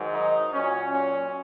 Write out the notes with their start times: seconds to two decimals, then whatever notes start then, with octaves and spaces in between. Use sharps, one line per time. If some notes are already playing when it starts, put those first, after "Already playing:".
Already playing: G#2 D#3 F#3
0.13 D#4
0.53 A#2 F#3 C#4
0.93 C#4